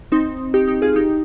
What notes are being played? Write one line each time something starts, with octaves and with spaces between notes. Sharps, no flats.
C4 D#4
D#4 G4
D#4 G4
F4 G#4
D#4 G4